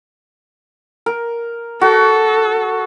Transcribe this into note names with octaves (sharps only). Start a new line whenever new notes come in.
A#4
F#4 A4